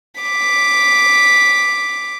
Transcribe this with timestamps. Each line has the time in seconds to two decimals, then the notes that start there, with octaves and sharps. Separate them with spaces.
0.21 D6 B6